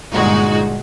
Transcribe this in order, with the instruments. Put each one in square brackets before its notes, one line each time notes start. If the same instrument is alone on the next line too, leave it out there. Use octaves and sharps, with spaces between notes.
[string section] G1 A#2 G#3 D#4 F#4